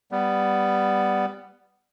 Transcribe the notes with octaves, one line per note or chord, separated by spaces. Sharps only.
G3 B3